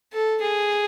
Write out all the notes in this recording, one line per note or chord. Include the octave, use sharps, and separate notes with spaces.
A4
G#4